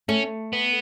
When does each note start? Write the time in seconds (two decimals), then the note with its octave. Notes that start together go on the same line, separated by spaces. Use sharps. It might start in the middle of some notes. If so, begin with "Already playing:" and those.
0.09 A3 C#4
0.53 B3